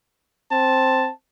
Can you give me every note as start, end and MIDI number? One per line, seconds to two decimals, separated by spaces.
0.52 1.08 60
0.52 1.12 81